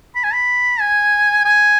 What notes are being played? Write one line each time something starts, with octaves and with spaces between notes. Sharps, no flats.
B5
G#5
B5
G#5
G#5